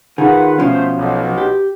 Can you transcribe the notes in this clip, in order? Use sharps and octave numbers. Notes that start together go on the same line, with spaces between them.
D#3 F4 G#4 B4 F#5
B2 F3 A3 C#4 C5
B1
G4